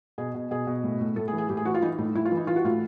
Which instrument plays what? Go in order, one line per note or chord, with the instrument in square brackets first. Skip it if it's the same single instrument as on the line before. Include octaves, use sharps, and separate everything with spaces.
[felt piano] B2 G#4
B2
B2 G#4
B2
A2
A2
A2 A4
G#4
E3
G#4
A2 G4
G#4
E3 F#4
F4
E3 D#4
A2 D#4
A2 E4
F4
E3
D#4
E3 F4
F#4
A2 F4